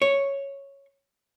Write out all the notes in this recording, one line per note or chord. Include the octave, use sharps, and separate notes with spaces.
C#5